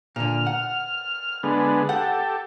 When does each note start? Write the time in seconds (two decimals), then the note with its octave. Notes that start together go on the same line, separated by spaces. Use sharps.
0.16 A#2 D3 F6
0.46 F#5
1.43 D3 G#3 B3
1.89 G4 A4 F#5